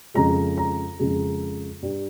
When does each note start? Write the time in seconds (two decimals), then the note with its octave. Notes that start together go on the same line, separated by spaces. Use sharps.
0.14 F2 C#3 G#3 A#5
0.57 A#5
0.99 F2 C#3 G#3
1.82 G2 G3